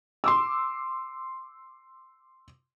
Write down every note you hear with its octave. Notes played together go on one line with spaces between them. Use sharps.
C6 D6 E6